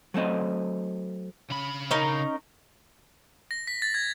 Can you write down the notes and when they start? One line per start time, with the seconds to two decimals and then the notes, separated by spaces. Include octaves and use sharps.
0.14 F#3 A3 C4 D#5
1.50 C#3 B5
1.91 C#4 D#4 A#4
3.51 A#6
3.67 B6
3.82 A6
3.94 G#6